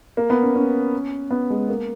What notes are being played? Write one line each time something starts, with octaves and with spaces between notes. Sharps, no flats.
A#3
B3
C#4
C#4
B3
G#3
A#3